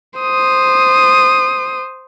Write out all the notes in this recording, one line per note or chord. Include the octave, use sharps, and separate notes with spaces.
C5 D#6